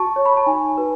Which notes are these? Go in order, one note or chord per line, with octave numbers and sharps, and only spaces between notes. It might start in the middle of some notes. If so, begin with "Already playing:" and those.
Already playing: F#4 A5 C#6
C#5
B5
A5
D#4 G#5
F#4 B4